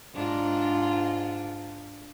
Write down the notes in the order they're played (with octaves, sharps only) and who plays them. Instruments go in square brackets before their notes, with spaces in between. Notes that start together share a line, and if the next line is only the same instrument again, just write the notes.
[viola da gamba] G#2 D4 F4